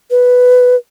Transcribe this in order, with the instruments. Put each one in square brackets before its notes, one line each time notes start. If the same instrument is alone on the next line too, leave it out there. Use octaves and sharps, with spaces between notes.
[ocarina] B4